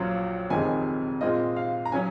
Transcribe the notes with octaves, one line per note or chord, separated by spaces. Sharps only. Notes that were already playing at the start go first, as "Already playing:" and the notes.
Already playing: A#1 A#2 F#3 C#4 F4
F1 F2 C3 D#3 G#3 G#5
A#2 G#3 C4 F4 D#5
F5
A#5
C#3 F#3 C#4 G#5